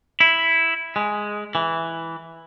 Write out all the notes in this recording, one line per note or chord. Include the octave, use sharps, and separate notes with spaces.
E4
G#3
E3